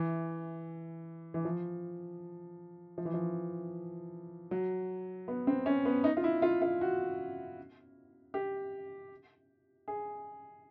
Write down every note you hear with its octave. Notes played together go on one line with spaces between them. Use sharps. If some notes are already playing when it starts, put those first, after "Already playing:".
Already playing: E3
E3
F3
F3
E3
F3
F#3
B3
C4
C#4
B3
D#4
F4
E4
F4
F4
F#4
G4
G#4